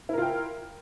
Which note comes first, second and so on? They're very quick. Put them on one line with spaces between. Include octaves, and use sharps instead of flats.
E4 A#4 F4 G5